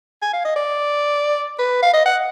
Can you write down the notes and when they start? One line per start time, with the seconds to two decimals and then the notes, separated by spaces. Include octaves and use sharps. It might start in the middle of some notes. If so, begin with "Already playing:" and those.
0.22 G#5
0.33 F5
0.45 D#5
0.56 D5
1.59 B4
1.82 F5
1.93 D#5
2.05 F#5